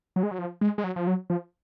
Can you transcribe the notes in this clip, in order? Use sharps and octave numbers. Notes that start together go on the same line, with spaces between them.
F#3
G#3
F#3
F3
G#3
G#3
F#3
F3
F#3
F3